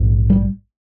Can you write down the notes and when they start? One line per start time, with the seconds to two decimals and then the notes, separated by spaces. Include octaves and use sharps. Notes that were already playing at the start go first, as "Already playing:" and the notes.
Already playing: A#1 G#2
0.30 G3